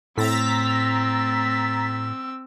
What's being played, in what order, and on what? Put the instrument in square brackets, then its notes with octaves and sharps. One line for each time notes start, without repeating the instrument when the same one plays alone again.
[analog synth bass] A2 [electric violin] C4 E6 [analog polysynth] A#5 A6 B6